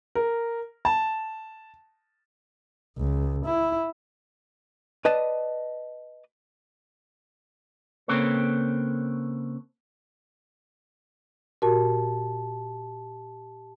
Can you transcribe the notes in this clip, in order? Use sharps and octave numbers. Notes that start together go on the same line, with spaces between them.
A#4
A5
C#2
E4
B4 D5 D#5 A5
C#3 A#3 C4 A4 B4 C#5
A#2 F#4 G4 A#4 A5